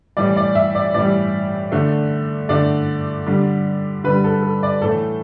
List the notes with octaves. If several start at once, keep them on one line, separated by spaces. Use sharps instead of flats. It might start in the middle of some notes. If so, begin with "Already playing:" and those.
A2 E3 G3 D5
D5
E5
D5
A2 E3 G3 D5
D3 A3
D3 A3 D5
D3 G3
D3 G3 B4
A4
A4
D5
A2 E3 A3 A4